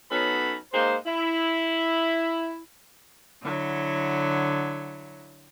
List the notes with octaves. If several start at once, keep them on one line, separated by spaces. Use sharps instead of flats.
F#3 B3 C#4 D#4 A4 B5
G#3 A#3 D#4 C5
E4
D3 F#3 E4